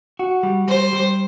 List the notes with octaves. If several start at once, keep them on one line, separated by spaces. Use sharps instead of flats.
F#4
G3
G3 C5
G3